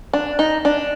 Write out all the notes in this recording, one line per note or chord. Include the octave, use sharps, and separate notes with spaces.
D4
D#4
D4